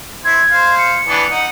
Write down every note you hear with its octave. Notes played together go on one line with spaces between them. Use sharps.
E4 C5 G#6
C5 F5
C#7
E3 B3 D4
D#4 F#5